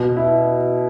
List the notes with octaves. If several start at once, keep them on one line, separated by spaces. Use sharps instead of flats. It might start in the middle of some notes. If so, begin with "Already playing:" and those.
Already playing: B2
E4